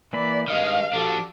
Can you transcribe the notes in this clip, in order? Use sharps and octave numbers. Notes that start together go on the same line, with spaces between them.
E3 A#3 D5 B5
G2 D#3 G#3 D#5 F5 F6
F3 D4 F#4 G4 A4